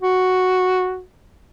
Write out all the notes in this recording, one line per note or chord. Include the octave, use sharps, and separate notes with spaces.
F#4